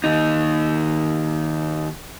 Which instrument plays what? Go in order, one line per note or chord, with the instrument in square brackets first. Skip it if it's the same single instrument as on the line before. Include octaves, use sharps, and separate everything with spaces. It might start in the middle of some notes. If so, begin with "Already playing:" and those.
[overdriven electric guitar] D#2 D#4